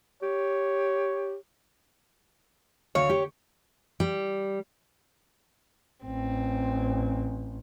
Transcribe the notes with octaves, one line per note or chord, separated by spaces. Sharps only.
G4 C#5
D2 C#5 F5
G4
G3
A1 C4